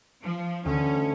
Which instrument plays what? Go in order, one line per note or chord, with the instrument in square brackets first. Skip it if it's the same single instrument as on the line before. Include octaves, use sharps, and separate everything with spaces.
[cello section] F3
[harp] D2 [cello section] C#4